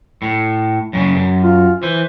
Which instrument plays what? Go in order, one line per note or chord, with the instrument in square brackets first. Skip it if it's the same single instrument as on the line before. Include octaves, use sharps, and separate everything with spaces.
[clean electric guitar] A2
F#2 A#2 C#3
F#2
[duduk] F4
[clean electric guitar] E3 [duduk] C5